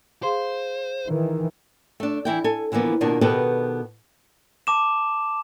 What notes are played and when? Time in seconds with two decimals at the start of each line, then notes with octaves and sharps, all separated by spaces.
0.23 G#4 C5 F5 C6
1.07 D#3 E3
2.00 A3 D4
2.25 E3 E4 G5
2.44 A4 G#5
2.72 D3 E3 F3 A#3 B3
3.01 B2 D#3 A#3 D4 F4
3.21 B2 D#3 B3 G4 A4 B4
4.67 A5 D6 E7